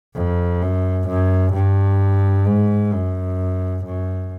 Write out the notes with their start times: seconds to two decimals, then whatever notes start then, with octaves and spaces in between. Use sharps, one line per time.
0.15 F2
0.62 F#2
1.08 F#2
1.54 G2
2.47 G#2
2.93 F#2
3.85 F#2